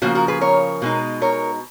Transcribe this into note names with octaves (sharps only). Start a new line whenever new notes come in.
C#3 F3 A#3 F#4 A#4
F#4 A#4
G#4 B4
A#4 C#5
B2 G#3 D#4
A#4 C#5